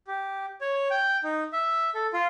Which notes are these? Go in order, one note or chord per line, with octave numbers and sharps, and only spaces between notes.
G4
C#5
G5
D#4
E5
A4
F4